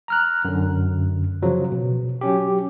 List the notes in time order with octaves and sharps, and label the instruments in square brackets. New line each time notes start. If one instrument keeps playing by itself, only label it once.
[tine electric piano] A#5 F6 F#6
F#2 D3
C#3 F3 F#3
B2
F#3 C#4 G4